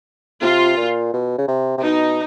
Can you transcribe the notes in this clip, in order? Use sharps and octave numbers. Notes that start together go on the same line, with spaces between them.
C3 F4
A#2
B2
C#3
C3
C3
B2 D#4